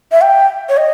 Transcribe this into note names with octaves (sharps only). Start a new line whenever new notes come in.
E5
G5
C#5
D#5